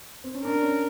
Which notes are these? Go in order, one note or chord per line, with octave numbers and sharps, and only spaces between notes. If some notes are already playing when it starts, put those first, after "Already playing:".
C4
C#4
D4 A#4
C#4